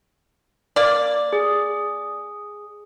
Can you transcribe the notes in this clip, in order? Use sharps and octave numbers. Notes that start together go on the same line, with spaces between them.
A#3 D5
G#4